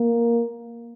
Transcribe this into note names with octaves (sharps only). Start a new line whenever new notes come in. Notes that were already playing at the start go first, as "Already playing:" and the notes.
Already playing: A#3